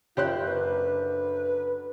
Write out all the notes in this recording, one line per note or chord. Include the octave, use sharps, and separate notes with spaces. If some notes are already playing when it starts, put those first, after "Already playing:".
F#1 F4 G4 C5 F#6
D3 F#3 D4 B4